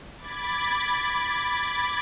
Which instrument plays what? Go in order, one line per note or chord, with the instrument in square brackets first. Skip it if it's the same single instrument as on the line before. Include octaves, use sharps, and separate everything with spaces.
[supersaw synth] B5 D6 G#6 A6